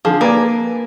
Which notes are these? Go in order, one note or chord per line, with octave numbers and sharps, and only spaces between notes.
D3 F3 G#4
A#3 B4 D5 G#5